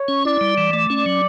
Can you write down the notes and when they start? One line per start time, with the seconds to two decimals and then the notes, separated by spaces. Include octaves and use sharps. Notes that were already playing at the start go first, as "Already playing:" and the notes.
Already playing: C#5
0.08 C#4
0.24 E4 D5
0.41 G3
0.58 E3
0.73 A3 D5
0.90 C#4
1.06 F#3